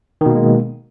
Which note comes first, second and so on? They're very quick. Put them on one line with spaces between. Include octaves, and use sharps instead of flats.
D#3 B2 A#3 G#3